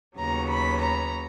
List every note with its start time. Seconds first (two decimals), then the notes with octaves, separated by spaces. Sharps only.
0.17 D#2 C#3 F#3 B3 A#5
0.50 B5
0.81 A#5